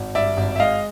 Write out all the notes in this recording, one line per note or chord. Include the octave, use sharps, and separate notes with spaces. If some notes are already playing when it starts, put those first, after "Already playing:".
Already playing: G#1
G2 D5 E5
G#1
E5
G#3 D#5 F5